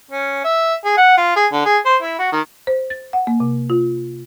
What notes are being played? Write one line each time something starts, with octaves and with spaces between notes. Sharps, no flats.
C#4
E5
G#4
F#5
F4
G#4
D3
G#4
C5
E4
F#4
D#3
C5
A6
F#5
A#3
C3
F4